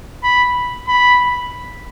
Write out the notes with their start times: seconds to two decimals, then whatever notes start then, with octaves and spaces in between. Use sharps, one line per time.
0.24 B5
0.88 B5